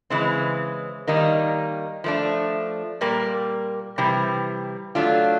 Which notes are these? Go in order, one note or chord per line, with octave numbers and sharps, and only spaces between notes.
C#3 E3 G#3 C4
D#3 G3 A#3 D#4
F3 A3 D4
A#2 G3 A#3
C3 E3 G3
F#3 A3 D4 F4